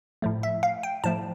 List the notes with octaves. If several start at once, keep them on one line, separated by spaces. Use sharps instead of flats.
A2 F3 A3
E5
F5
G5
A2 F3 A3 A5